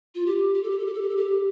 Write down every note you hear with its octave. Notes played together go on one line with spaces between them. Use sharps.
F4
G4
G4
A4
G4
A4
G4
A4
G4
A4
G4